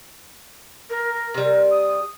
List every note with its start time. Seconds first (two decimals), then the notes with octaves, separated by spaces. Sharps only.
0.90 A#4
1.34 C3 G3
1.71 D#6